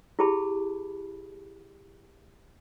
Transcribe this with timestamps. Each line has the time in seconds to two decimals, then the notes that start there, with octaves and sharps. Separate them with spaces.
0.19 E4 G4 G#4 A5 B5